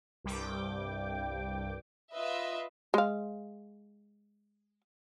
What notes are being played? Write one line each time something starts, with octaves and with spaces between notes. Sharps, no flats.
C2 G2 G3 G5 D6
F4 B4 D#5 E5
G#3 F5